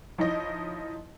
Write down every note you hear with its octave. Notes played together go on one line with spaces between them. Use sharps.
F3 D#4 E4 C#5 D#5